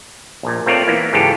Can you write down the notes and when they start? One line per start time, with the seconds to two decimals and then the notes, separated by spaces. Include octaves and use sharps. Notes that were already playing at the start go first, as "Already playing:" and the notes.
0.43 A#1 A#2
0.66 A3 C4 F4 A#4 C#5 D5
0.87 E3 A#3 B3 E4
1.13 G#2 C#3 E3 F4 G4 A4